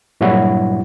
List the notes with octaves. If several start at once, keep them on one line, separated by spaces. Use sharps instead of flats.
G2 A#2 F#3 G3 E4 F#4